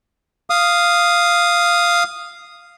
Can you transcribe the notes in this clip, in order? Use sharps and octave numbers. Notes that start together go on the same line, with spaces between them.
F5 D#6